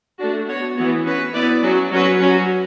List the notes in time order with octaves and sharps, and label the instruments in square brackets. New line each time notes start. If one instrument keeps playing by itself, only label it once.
[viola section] A3 D4 F#4
B3 F#4 C#5
E3 B3 F#4
C#4 F#4 B4
B3 E4 B4 D5
F#3 C#4 F#4
F#3 C#4 F#4 B4
F#3 C#4 F#4